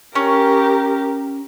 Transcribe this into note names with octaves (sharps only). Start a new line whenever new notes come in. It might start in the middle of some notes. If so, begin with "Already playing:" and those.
C#4 G4 A#4